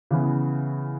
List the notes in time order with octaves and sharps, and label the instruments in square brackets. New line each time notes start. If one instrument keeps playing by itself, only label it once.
[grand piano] C#3 E3 B3